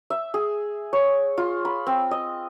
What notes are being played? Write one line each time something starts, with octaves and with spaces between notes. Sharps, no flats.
E5
G#4
C#5
F4
B5
C4
D#5